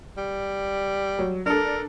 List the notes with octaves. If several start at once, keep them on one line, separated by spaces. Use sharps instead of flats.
G3
F#3
D4 A4 A#4